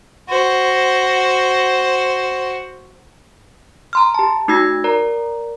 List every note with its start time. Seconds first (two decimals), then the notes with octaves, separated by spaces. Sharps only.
0.29 F#4 C5
3.93 A#5 C6 F6
4.14 G4 A5
4.48 A3 D#4 F#4 E6 G#6 A#6
4.84 A#4 D5 A#5